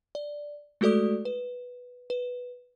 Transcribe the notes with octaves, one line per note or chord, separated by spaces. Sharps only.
D5
G#3 A3 F#4 A4 D5 D#6
B4
B4